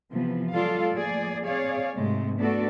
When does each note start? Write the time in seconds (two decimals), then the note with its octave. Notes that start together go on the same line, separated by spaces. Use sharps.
0.12 C3 E3 F3 B3
0.53 F#3 G#3 F4 A4 D5 F5
0.93 F3 A3 A#3 G#4 D5
1.45 C4 G#4 C#5 D5 F5
1.95 G#2 C3 G#3 A3
2.38 A3 B3 D4 F#4 A4 D5